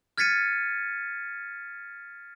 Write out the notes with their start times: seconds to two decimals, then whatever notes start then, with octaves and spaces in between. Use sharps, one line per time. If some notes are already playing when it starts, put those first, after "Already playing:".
0.18 F6 G#6 A6 B6 C#7 D#7